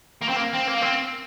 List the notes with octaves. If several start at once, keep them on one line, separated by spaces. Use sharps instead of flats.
A#3
C4
A#3
C4
A#3
C4